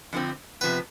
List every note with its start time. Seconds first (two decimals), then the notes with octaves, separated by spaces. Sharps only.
0.13 F2 D3 F3 C4
0.61 C3 F3 B3 B4